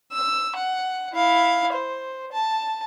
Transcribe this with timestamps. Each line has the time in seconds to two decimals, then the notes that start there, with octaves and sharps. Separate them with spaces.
0.12 E6
0.56 F#5
1.13 E4 F5
1.73 C5
2.32 A5